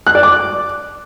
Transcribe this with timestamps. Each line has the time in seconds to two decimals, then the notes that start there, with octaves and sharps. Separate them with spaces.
0.07 F#6
0.15 D5
0.23 D6